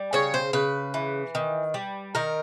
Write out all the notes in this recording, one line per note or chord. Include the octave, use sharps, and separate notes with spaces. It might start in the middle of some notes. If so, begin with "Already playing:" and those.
Already playing: G3
C#3 C#5
C5
C#3 B4
E3
D#3
G3
D#3 A#4